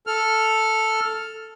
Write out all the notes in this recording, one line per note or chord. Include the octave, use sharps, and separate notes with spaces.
A4 F6